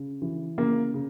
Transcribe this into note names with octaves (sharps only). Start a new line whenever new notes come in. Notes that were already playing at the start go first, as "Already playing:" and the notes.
Already playing: C#3
E3
C#3 A#3
C#3